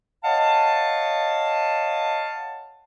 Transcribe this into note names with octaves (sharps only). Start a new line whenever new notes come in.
C#5 D#5 F5 F#5 A5